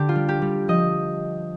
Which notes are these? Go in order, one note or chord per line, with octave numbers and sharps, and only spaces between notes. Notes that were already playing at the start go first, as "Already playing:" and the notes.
Already playing: D3 G4
F4
G3
G4
G3
F3 D#5